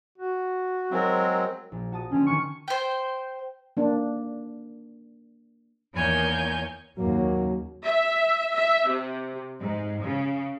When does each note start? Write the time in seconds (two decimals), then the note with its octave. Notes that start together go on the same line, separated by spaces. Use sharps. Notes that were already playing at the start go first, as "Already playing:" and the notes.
0.18 F#4
0.91 F#3 G#3 C4 A#4
1.72 A#1
1.92 F#4 A5 D#6
2.11 D3 C4 C#4
2.27 D#3 G#5 C#6 F6
2.68 C5 G5
3.77 A#3 D4
5.93 E2 D#3 A#3 C#5 G#5 G6
6.97 D#2 C#3 F#3 A#3
7.84 E5
8.53 E5
8.88 C3
9.60 G#2
10.03 C#3